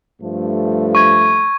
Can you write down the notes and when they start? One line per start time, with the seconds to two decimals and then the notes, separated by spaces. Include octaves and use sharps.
0.21 G2 F3 A3
0.95 C#6 G#6